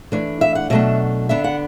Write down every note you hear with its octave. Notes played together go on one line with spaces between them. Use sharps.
E3 A3 D4
E5
F#5
B2 F#3 A3 D4 E5
D3 B3 D4 E5
F#5